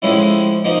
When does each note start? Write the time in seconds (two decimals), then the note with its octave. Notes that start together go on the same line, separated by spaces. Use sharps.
0.02 A2 F3 G#3 C#4 E4
0.64 F3 A#3 D#4